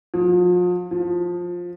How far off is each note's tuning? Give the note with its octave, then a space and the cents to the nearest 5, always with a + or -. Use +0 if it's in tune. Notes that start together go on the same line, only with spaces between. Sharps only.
F3 +40
F3 +15